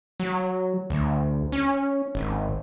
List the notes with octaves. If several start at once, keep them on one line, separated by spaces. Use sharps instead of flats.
F#3
D2
C#4
G#1